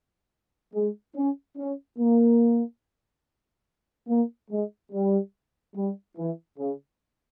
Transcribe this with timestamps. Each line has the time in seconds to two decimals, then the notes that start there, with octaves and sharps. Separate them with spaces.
0.74 G#3
1.16 C#4
1.58 C#4
1.99 A#3
4.08 A#3
4.51 G#3
4.92 G3
5.76 G3
6.18 E3
6.59 C#3